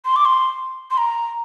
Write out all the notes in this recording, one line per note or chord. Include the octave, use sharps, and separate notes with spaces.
C6
D6
C6
C6
A#5